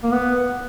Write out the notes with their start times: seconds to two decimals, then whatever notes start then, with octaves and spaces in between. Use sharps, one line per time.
0.03 A#3
0.12 B3